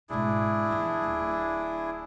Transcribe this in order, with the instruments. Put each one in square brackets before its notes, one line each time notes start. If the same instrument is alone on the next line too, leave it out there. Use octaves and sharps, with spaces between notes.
[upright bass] G#1 B2 [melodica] D4 E4 G#4
[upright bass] A#1 E2
D1 D3